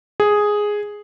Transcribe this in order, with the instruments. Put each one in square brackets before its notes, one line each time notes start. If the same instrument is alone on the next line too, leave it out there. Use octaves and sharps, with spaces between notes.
[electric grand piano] G#4